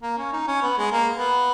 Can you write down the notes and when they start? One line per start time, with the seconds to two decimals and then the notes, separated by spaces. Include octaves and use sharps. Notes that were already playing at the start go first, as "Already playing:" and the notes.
0.03 A#3
0.18 C#4
0.33 D#4
0.48 C#4
0.63 B3
0.78 G#3
0.92 A#3
1.14 B3